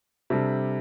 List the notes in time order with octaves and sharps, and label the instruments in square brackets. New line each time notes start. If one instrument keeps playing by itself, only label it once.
[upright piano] C3 G3 D4 A4